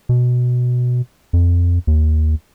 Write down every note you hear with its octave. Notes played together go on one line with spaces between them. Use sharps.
B2
F2
D#2